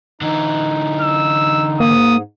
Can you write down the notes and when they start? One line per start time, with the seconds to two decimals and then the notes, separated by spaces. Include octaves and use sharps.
0.21 D3 E3 D#4
1.02 E6
1.80 G#2 A#3 D#6